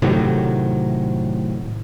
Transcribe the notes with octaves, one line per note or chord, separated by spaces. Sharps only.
A2 C3 D#3 F#3